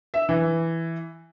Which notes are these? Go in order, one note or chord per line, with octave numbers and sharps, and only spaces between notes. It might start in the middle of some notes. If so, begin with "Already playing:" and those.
E5
E3